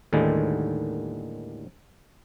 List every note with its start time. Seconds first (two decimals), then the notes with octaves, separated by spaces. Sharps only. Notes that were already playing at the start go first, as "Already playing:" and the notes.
0.13 D#2 A2 D3 D#3 G3 G#3